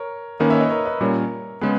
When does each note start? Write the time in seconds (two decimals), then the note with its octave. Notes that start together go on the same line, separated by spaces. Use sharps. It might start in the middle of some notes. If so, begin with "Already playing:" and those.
Already playing: A#4 C#5
0.40 D#3 A#3 C#4 B4 D#5
0.50 C#5 E5
0.60 B4 D#5
0.70 A#4 C#5
0.85 B4 D#5
1.00 A#2 G3 C#4 A#4 C#5
1.61 C#3 G#3 B3 G#4 B4